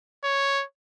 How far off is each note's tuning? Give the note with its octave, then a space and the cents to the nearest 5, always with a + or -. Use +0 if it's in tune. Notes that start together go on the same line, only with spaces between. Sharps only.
C#5 +0